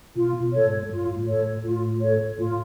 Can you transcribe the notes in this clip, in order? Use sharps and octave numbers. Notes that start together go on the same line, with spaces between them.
B2 F4
B2
A4 C#5
G#2
G2 F4
A2
A4 C#5
A2
A2 F4
A4 C#5
A2 F4